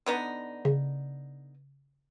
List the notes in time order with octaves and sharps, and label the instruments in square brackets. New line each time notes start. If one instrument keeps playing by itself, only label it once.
[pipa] D3 B3 D#4
[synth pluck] C#3